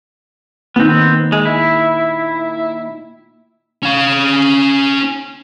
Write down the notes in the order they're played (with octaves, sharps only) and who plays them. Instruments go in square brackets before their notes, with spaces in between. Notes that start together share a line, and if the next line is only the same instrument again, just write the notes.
[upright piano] A#2 D#3 [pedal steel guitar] B3 C4
[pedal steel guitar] G#3
E4
[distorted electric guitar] C#4 F5